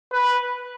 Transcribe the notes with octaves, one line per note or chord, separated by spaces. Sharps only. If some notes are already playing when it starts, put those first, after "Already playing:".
B4